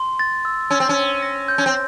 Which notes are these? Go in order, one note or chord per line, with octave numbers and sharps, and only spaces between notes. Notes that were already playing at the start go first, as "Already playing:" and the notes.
Already playing: C6
A6
E6
C#4 E6
C4
C#4
E6
A#6
G6
C#4
C4